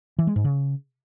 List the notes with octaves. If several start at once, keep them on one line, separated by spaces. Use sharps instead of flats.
E3
G#3
G#2
C#3